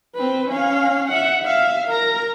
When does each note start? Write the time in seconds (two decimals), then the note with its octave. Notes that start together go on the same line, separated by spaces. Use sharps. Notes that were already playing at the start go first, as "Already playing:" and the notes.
0.15 C4 B4
0.49 C#4 F5
1.08 E5 F#5
1.42 E5 F5
1.88 A#4 A#5